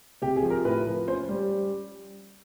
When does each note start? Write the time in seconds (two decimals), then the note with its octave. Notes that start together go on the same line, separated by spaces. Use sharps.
0.22 C3 G4
0.36 G#4
0.43 F3
0.50 A#4
0.65 A2 B4
0.87 F3
1.07 C#4 C5
1.29 G3